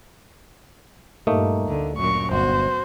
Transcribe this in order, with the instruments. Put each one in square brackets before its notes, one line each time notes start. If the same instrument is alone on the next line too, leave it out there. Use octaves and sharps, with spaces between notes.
[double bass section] G2 A#2 G3 [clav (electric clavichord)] A3 A#3 D#4
[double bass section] D2 [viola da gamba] D3
[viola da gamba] F#2 A#2 A#4 [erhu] C#6
[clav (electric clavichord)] G1 [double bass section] B3 [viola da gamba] F#4 [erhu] C5